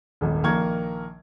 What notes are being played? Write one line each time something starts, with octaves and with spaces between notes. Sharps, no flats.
D#1 G#1
A#1 D#3 A#3 A#4 C#6 G#6